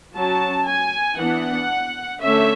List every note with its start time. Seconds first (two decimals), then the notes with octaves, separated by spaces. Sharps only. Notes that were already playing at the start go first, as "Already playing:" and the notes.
0.15 F#3 C#4 A5
0.66 G#5
1.18 E3 B3 D4 F#5
2.22 D3 A3 C#4 E5